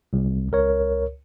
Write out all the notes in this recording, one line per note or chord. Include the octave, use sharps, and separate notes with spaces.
C2
C#2 A#4 C#5